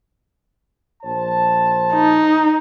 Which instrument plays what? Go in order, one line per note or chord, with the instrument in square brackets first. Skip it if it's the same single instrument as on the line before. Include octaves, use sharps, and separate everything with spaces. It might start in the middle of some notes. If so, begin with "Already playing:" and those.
[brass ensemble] A#1 C5 A5
[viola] D#4